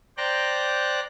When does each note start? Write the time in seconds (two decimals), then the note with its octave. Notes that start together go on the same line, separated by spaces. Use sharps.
0.17 C5 D5 G5 A#5 F#6 A#6